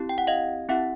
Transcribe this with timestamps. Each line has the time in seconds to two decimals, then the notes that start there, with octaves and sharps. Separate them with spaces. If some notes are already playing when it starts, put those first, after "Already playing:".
Already playing: C4 E4 G4
0.09 G5
0.18 F#5
0.27 D#5 F5
0.69 C4 E4 G4 E5 F#5